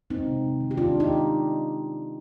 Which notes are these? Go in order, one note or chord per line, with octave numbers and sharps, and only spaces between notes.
G#3 C4 D#4
C3
C3
D#3
G4
D#3 D4 F4
G#3
D#4 G4